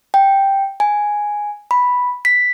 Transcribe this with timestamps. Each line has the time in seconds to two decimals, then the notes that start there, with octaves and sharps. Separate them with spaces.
0.14 G5
0.80 G#5
1.71 B5
2.25 B6